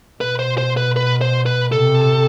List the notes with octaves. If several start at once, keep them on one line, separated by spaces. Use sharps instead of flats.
B2 B4
C5
C5
B4
B4
C5
B4
C3 A4